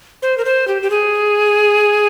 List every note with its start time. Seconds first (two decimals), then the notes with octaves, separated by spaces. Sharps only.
0.22 C5
0.38 A#4
0.45 C5
0.68 G4
0.82 G4
0.90 G#4